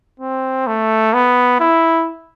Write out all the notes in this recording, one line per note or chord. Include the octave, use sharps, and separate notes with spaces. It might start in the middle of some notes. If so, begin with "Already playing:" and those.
C4
A3
B3
E4